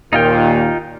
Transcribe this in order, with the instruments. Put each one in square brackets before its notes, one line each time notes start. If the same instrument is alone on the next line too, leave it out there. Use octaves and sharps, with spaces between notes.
[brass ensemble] D#2 A#2 D#3 [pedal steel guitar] D#4 F4 G5